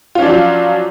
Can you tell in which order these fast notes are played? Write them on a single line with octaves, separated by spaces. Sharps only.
F4 C#4 D4 F3 F#3